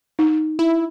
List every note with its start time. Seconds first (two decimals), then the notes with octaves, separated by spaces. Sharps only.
0.19 D#4
0.59 E4